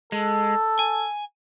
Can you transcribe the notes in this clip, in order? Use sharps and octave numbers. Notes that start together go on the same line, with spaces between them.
G#3 A4
G#5